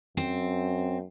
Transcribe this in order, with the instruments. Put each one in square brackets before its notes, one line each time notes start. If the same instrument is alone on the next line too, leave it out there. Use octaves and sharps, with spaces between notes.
[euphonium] F#2 [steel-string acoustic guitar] C4